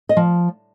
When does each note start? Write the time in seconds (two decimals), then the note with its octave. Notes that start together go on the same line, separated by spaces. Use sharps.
0.09 D#5
0.17 F3